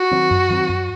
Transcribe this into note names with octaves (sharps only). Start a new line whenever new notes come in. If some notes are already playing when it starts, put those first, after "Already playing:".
Already playing: F#4
D#3 F#3 C4
F#2
D#3 F#3 C4
F#2